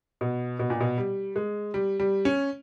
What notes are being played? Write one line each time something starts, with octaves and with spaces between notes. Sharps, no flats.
B2
B2
A#2
B2
G3
G#3
G3
G3
C#4